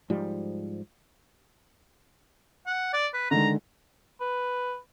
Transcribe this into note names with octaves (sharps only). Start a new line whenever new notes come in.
G#2 F3 G3
F#5
D5
B4
D3 D#3 G#3 A#5
B4